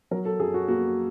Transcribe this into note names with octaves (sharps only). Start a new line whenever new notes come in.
F#3 A#4
A4
F#2 G#4
F#4
A#3 F#4